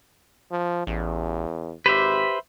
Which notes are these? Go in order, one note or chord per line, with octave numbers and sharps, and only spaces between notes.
F3
A1 E2
G#1 G4 B4 C5 E5